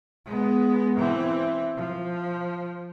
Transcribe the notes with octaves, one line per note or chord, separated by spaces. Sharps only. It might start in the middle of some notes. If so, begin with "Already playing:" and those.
G#3 B3
E3 C4
F3